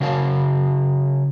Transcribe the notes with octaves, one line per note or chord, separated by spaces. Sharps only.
C#3 F#3 F#4 A#4 F5 A5